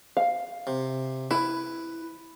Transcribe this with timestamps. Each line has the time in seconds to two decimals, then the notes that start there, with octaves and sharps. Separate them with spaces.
0.17 F5
0.67 C3
1.31 E4 B4